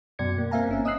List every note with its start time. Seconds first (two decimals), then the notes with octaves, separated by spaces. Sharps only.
0.19 F#2 B2 D5 G#6 C#7
0.38 A#3
0.51 A#3 C4 E5 F5 G#5 A#5
0.69 G1 C#4 E5
0.85 D#5 D#6 E6 F#6 C7